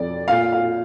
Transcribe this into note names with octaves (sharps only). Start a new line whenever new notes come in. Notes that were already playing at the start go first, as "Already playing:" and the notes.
Already playing: F2 D5
A#2 F5
F5